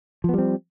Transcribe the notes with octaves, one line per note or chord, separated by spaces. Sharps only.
F3 G3 B3 C4